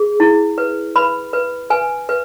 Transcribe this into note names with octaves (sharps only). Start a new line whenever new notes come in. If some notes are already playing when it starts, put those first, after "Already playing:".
Already playing: G#4
E4
B4
B4 B5
B4
B4 G#5
B4